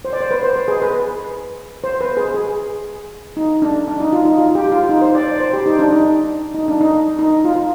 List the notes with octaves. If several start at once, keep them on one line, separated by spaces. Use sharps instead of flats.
C5
D5
C5
B4
C5
B4
G#4
B4
C5
B4
G#4
G#4
D#4
D4
D4
D#4
F4
D#4
F4
G4
F4
D#4
C5
D5
D5
C5
G4
D#4
D4
D#4
D#4
D4
D#4
D#4
F4